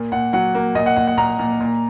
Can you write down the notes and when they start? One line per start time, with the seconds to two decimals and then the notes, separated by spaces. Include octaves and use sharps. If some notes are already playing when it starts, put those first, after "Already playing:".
Already playing: A#2 A#3
0.12 A#2 F#5
0.33 F#3 F#5
0.55 A#3
0.75 A#2 D#5
0.86 F#5
0.96 A#2 F#5
1.07 F#5
1.17 A#2 A#5
1.39 A#2
1.60 A#2